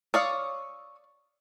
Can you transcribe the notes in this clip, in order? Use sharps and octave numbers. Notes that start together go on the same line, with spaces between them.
C#5 D5 F5 C#6 D#6 E6